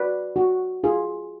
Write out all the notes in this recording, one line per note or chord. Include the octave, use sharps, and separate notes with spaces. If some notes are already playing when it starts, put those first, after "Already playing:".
Already playing: F#4 B4 D5
F#4
F4 G#4